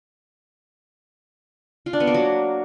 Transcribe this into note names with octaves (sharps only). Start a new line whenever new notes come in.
F4
D4
B3
A#3
F#3